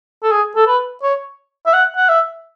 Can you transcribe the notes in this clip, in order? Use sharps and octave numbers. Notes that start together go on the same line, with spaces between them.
A4
G#4
A4
B4
C#5
E5
F#5
F#5
E5